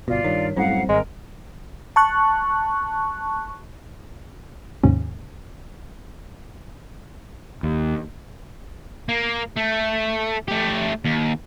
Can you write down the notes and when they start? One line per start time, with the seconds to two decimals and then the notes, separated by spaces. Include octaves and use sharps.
0.08 G1 B2 F4 D5
0.24 G2 D#3 C#5
0.56 F#2 A2 G3 C4 C5 F5 F#5
0.89 G#1 G#3 A#4
1.96 A5 C#6 F#6
4.84 D#2 G#2 C3 D#3 C#4
7.63 D#2
9.09 A#3
9.56 A3
10.48 A3 G4
11.05 D#2